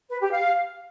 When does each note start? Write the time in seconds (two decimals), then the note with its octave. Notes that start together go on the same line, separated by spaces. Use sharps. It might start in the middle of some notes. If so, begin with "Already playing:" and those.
0.10 B4
0.21 G4
0.31 F5